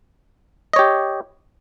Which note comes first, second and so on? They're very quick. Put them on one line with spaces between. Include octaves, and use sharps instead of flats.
D#5 C#5 G4